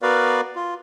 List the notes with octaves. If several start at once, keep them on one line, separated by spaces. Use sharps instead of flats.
B3 F#4 A#4 B4 D5 F5
F4